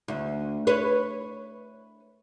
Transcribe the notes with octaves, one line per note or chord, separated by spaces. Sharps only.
D2
B4 C#5